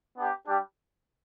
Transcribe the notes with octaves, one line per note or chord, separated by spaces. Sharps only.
B3 D4 G4
G3 D4 G4